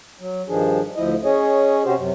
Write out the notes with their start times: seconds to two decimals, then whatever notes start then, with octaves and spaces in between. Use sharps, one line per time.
0.20 F#3
0.48 G2 D#3 F3 D4 G#4
0.96 D2 F3 E4 D#5
1.24 C#4 G#4 C#5 D#5
1.85 C3 C#4 F#4 G4 C5
1.97 F#2 C3